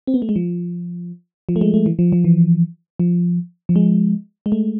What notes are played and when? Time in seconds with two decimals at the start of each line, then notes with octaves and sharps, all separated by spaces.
0.07 C4
0.14 B3
0.22 A3
0.29 G#3
0.36 F3
1.49 F3
1.56 A3
1.61 G#3
1.74 A3
1.86 E3
1.99 F3
2.12 F3
2.25 E3
3.00 F3
3.69 F3
3.76 G#3
4.46 G#3
4.52 A3